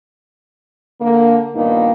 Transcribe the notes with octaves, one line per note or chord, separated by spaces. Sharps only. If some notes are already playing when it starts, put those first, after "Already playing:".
D3 A#3
G2 A#2 D#3 A#3 B3 D#4